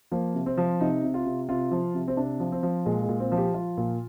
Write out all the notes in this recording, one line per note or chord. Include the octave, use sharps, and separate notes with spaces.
F3 A#3
C3
C4
F3
C3 D#4
C3
F4
C3
C3 F4
F3
C3
C4
C3 D4
F3
C4
F3
A#2 G#3
G#3
A#2
C4
F3
G4
F3 F4
A#2